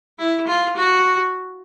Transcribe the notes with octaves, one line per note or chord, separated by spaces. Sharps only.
E4
F4
F#4